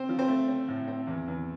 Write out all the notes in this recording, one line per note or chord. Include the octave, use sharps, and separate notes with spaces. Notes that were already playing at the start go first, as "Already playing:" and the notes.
Already playing: C4 C5
F3
C4 C5
A3
C4
A2
C4
E2
E2